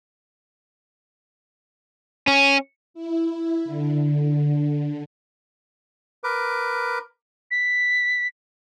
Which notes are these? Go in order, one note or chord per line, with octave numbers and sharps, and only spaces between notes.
C#4
E4
D3
D3
A#4 B4 D6
B6